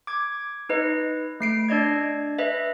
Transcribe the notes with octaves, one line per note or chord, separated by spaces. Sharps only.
D6 G#6
D#4 B4 D#5
A3 C7 D7
D4 D5 D#5 G#6
B4 D#5 E5